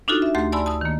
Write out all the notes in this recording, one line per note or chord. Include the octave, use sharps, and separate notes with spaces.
D4 D#4 F4 F#4 A4
E5
D2 A3 G4 C6 A6
D5 G#5 A5 B5 C6 E6
A5 D#6 E6
D#3 A#3